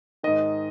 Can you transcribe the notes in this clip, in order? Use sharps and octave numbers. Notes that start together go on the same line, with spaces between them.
G#2 D#3 D#5